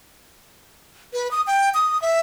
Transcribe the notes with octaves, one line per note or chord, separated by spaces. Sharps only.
B4
D#6
G5
D#6
E5